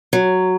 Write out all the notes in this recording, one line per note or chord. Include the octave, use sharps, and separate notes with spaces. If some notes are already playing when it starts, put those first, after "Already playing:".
F#3